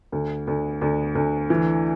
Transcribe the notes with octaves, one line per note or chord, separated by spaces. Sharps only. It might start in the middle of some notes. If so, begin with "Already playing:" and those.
D2
D2
D2
D2
E3